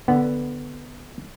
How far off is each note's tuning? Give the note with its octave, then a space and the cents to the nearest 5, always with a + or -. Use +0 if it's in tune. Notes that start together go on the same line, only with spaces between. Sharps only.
D3 +0 B3 +0 F#5 +0